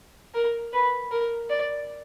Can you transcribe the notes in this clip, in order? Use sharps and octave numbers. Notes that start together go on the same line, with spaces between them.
A#4
B4
A#4
D5